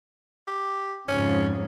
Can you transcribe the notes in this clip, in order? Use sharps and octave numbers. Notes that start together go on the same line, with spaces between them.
G4
F2 G#2 C#3 C#4